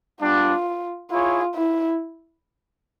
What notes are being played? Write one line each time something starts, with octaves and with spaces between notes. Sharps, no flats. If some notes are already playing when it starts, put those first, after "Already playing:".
G3 B3 D4 F4
E4 F4 G#4 C#5
E4